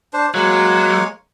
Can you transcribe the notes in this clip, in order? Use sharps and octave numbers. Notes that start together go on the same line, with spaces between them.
D4 C5
F#3 G#3 A#3 C#5